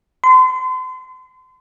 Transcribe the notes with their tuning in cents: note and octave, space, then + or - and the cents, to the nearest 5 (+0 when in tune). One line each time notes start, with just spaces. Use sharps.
C6 -35